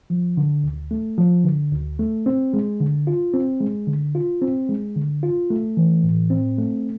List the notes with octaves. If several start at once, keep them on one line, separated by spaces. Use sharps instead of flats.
F3
D3
D2
A3
F3
D3
D2
A3
C4
G#3
D3
F4
C4
G#3
D3
F4
C4
G#3
D3
F4
A3
E3
A2
C4
A3